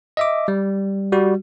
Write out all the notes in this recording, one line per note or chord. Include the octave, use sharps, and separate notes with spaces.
D#5 E5 D6
G3
G3 F#4